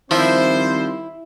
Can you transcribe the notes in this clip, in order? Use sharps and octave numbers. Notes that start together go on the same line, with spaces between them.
D#3 F3 G3 C4 E4 C5